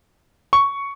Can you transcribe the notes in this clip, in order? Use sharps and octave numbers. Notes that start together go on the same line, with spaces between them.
C#6